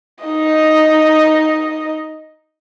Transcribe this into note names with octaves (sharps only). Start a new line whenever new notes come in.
D#4 D#5